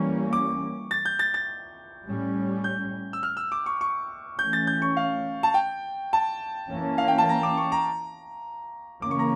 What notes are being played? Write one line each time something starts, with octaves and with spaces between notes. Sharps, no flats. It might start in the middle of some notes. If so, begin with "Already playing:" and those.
Already playing: E3 G3 A#3 C#4 C#6
D6
A6
G6
A6
A6
A2 G3 C#4
G6
E6
F6
E6
D6
C#6
C#6
E3 A3 C#4 G6
A6
G6
C#6
F5
A5
G5
A5
E3 A#3 C#4
F5
G5
A5
A#5
D6
C#6
A#5
C#3 E3 A#3 C#4 D6
C#6
A#5